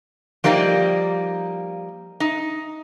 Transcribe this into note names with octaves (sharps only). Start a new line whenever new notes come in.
F3 G3 A#3 D#4 D5 F5
D#4